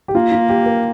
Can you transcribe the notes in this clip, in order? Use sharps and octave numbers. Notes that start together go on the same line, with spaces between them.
G4
A#3 F4
F4
G4
A#4